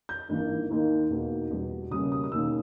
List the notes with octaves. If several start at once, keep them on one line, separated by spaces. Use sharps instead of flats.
G6
G#1 G2 E3 A#3
D#2 D#3 A#3 D#4
E2 B2 A#3 D#4
E2 B2 G3
C#2 B2 G3 A#3 C#4 D#6
D#6
D#6
E1 D#2 D#3 A#3 C#4 E6